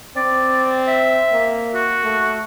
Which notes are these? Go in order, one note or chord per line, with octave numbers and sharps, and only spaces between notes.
C4 D5
E5
A#3
F#4
A3